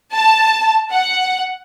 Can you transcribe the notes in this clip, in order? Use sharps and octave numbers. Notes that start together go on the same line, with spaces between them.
A5
F#5